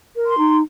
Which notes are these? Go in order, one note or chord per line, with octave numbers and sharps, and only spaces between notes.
A#4
C6
D#4